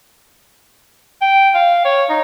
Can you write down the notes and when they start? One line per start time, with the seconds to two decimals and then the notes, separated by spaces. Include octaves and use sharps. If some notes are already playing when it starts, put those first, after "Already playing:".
1.21 G5
1.55 F5
1.85 C#5
2.10 D#4